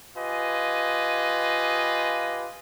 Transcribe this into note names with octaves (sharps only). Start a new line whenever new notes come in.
F4 G4 B4 D#5 G#5